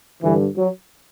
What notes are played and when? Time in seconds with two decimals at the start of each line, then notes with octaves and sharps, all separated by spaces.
0.22 G2 D3 E3
0.56 F#3